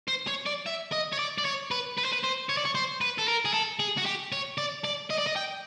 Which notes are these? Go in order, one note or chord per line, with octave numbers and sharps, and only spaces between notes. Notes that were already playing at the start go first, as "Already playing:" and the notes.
C5
C#5
D5
E5
D#5
C#5
D5
D5
C#5
B4
B4
C5
B4
C5
C#5
D5
C#5
C5
B4
A4
A#4
G#4
A4
G#4
F#4
G4
C#5
D5
D5
D#5
D5
D#5
G5